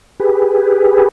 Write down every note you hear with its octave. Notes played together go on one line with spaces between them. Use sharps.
G4 G#4 B4